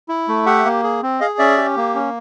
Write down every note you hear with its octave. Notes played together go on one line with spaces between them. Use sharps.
E4
A3
G4 E5 F#5
A#3
G#4
C4
G#4 D#5 F5
C#4 D5 E5
G4
A#3
C#4